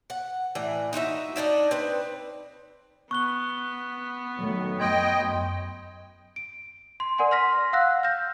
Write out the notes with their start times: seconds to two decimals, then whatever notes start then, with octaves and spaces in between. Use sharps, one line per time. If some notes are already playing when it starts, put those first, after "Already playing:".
0.10 F#5
0.55 A2 E3 D5
0.93 D#4 F#4 C5 E5
1.36 D4 D#4 D5 E5
1.71 C4 B4
3.11 B3 C#6 F#6 G7
4.37 D#3 F#3 A3
4.80 F#2 D#5 G5 C6 G#6
6.36 D7
7.00 C6
7.18 A#4 D5 F#5 G#5 C6
7.31 C6 F6 A#6 B6
7.73 F5 F#5 E6 F#6 A#6
8.03 F6 G6 A#6